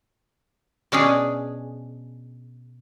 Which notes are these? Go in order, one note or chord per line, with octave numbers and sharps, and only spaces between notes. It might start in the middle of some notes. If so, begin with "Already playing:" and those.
B2 C#4 D4 G#4